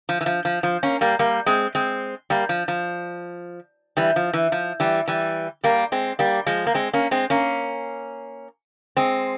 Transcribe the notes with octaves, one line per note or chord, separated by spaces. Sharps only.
F3
E3
F3
F3
F3
A#3 C#4
G3 A#3
G3 A#3
G#3 C4
G#3 C4
G3 A#3
F3
F3
E3 G3
F3
E3
F3
E3 G3
E3 G3
G3 A#3
G#3 C4
G3 A#3
F3 G#3
A#3
G#3 C4
A#3 C#4
G#3 C4
A#3 C#4
G#3 C4